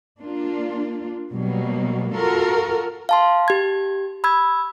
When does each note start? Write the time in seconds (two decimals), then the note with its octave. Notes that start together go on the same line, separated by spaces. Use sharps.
0.20 A#3 D4 F4
1.31 B2 F#3 G3 A#3
2.16 F4 F#4 A4 A#4
3.09 F5 A5 C6
3.48 G4 G#6
4.24 B5 E6 G#6